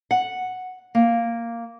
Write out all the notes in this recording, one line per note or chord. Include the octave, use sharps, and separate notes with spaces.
F#5
A#3